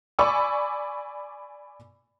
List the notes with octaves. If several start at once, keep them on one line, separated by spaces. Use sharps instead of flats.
D5 G#5 B5 C#6 D6 E6